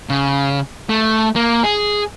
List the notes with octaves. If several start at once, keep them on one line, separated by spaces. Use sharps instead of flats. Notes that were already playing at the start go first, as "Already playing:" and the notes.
C#3
A3
A#3
G#4